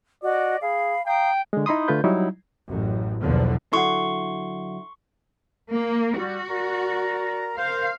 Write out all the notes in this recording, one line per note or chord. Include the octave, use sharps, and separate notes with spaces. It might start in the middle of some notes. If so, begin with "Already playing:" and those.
F#4 D5 D#5
G#4 F5 B5
F5 G5 A#5 D#6
D3 G#3
D#4 E4 B5 C6 D#6
D3 A3 F4 B4 G6
F#3 G3 D#4 E4
A1 F#2
B1 E2 A#2 D3 F3
D3 F#3 E4 A4 F#5 C6 C#6
A#3
G3 F#4
A#4 D5 A#5
A#4 C5 F5